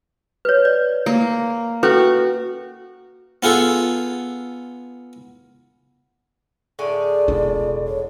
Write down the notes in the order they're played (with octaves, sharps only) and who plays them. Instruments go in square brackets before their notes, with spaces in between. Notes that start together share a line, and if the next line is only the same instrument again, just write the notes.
[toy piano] B4 C#5
D5
[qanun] A#3
[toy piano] C#4 A4 B4 [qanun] F#4
[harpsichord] B3 F4 G#4 A4
[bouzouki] A2 D3 G#4 [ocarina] D5
[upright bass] E1 F4
[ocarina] C#5